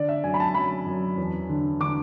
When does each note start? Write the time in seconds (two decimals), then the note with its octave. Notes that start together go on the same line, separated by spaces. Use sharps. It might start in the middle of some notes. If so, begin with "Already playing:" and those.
Already playing: D3 D5
0.09 E5
0.24 F#2 G#5
0.34 B5
0.40 A5
0.54 F#2 B5
0.86 F#2
1.17 E2
1.49 D3
1.80 D3 D6